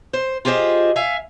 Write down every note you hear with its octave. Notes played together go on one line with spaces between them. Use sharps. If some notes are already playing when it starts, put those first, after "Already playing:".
C5
F4 G4 G#4 C5 D#5
E5 F5 G#5